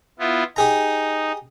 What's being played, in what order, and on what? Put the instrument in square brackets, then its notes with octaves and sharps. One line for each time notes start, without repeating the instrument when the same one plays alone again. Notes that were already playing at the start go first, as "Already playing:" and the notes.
[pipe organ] B3 E4 F4
[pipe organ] D#4 [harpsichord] G4 G#4 A#5